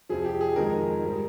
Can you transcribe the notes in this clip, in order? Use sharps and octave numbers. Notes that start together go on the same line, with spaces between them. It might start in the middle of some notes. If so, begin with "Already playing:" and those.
F2 C3 F3 G#4
G4
G#4
F2 D#3 G#3 A#4
G#2 G3